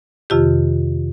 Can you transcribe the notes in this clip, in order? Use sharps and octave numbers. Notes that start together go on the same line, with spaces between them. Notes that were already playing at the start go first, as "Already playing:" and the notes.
F2 C3 D#3 F4 G4